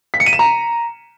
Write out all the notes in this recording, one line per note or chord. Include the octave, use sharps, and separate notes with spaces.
B6
C#7
D#7
E7
A#5